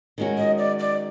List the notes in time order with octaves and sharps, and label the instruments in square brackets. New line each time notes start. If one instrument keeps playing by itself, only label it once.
[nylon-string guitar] D#3 G#3 C#4 F#4
[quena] D#5
D5
D5